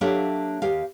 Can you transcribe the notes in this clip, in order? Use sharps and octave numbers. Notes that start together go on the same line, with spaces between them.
F#3 A#3 D4 G4 A4 E5
D#2 G4 F5